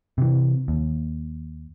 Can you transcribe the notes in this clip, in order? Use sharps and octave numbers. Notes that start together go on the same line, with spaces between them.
C3 E3
D#2